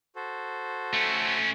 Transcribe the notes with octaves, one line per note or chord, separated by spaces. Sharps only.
F#4 A4 C5
A3 C#4